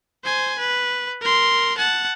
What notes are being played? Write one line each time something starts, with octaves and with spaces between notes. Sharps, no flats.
C5 G#5
B4
A#4 C6
F#5 A5